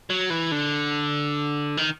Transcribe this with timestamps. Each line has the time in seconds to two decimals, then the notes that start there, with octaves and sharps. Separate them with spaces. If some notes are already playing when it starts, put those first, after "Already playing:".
0.10 F#3
0.30 E3
0.52 D3
1.77 D#3